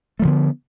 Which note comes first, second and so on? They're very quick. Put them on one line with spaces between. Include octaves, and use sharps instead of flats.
A3 F3 D3 B3